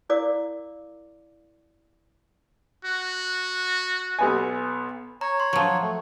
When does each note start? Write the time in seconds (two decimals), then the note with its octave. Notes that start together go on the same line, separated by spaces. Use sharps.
0.09 E4 A#4 D5 F5 D6
2.85 F#4
4.19 B1 B3 G#5
5.21 C#5 A#5
5.40 C6
5.53 F3 F#3
5.82 A3